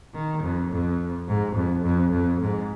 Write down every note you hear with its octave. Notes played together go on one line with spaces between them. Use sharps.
D#3
F2
F2
G#2
F2
F2
F2
G#2